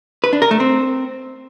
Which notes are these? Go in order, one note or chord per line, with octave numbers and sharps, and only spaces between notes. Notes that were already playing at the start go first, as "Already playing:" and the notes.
B4
D4
A#4
A3
C4